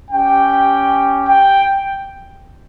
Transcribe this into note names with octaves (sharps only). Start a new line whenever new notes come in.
C#4 G4 G5
G5